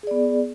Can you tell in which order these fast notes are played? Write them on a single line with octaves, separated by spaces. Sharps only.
G#4 D5 B3